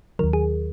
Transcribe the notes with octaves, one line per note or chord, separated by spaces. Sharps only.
D#2 D#3 F#3 A#4
G#4